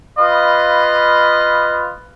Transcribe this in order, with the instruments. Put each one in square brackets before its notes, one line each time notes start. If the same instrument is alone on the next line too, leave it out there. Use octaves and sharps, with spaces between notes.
[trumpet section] F4 B4 D#5 F5 B5